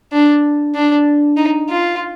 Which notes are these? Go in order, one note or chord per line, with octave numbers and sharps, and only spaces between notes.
D4
D4
D#4
F4